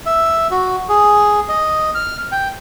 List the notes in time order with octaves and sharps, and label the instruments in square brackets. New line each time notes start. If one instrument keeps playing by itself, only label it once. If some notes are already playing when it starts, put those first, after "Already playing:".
[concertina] E5
F#4
G#4
D#5
F6
G5